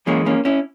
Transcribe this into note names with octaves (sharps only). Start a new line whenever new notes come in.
F#2 E3 G#3 A#3 C#4
A#3 C#4
C#4 E4